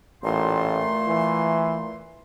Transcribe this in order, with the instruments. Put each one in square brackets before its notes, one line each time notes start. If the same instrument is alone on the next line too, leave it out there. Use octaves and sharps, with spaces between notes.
[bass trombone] A1 [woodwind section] A#2 A3 C6
[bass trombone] E3